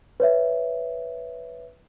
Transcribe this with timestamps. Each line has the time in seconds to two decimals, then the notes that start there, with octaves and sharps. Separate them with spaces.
0.20 B4 C#5 E5